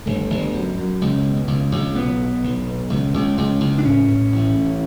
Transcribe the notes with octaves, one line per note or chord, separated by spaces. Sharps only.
G1 A3
G1
F#2
F#2
C#2
B2
C#2
C#2
B1 B3
B2
B1
B2
C#2
C#2
C#2
C#2
D4
A2 C#4
A2
A1
A2